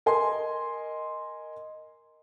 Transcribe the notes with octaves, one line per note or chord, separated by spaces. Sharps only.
A#4 D#5 G#5 C6